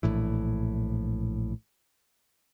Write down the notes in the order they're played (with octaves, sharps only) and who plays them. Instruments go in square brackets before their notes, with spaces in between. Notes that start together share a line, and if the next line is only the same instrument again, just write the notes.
[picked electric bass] A#1 A2 E3